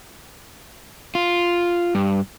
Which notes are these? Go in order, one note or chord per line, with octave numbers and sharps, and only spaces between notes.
F4
G2